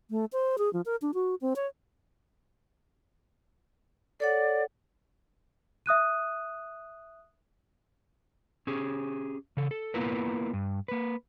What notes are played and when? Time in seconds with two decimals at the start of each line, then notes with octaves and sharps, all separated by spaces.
0.10 A3
0.33 C5
0.58 G#4
0.73 F3
0.86 A#4
1.02 D4
1.14 F#4
1.41 C4
1.56 C#5
4.20 A4 C#5 D5 F#5
5.86 E5 D#6 F#6 D#7
8.67 C#4 G4 G#4
9.57 C#3 A4
9.71 A4
9.94 A#3 B3 E4 F4 A#4 B4
10.53 G2
10.88 A#3 B4